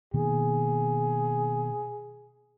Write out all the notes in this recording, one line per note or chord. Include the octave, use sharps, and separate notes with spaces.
B2 D#3 A#3 G#4